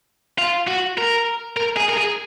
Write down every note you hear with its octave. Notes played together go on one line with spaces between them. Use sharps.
F4
F#4
A#4
A#4
G#4
A#4
G#4